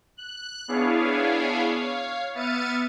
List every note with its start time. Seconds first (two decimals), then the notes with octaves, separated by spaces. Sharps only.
0.17 F#6
0.68 B3 D4 E4 G#4 C#5 F5
1.64 C#5 F5
2.35 B3 E5 F6 A6 C#7 D#7